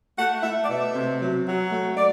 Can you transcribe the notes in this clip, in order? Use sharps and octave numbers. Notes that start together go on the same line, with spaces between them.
A3 F#5
A3 E5
D5
B2 E5
C3
F#3
F#3
A3
D5